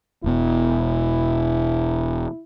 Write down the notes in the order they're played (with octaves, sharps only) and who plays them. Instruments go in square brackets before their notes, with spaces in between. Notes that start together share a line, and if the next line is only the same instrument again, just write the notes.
[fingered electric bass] E1 B2 [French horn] E4